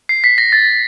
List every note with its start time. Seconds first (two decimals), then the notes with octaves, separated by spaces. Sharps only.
0.09 C7
0.24 B6
0.38 A#6
0.52 A6